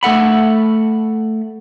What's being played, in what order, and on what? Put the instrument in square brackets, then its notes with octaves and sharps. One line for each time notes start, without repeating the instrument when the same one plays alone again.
[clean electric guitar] A3 A4 F#5 B5